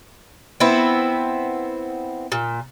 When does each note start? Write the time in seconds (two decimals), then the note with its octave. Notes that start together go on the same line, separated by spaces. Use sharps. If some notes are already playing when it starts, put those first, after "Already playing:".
0.60 B3 C4 E4
2.32 A#2